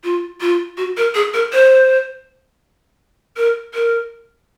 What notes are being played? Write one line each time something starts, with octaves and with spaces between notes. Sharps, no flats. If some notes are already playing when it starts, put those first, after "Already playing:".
F4
F4
F#4
A#4
G#4
A#4
C5
A#4
A#4